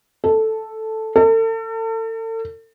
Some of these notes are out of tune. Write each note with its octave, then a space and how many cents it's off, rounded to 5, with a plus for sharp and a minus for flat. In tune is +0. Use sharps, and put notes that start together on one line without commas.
A4 +0
A4 +40